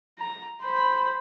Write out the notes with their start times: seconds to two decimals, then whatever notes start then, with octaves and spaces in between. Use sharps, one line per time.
0.18 A#5
0.62 C5 B5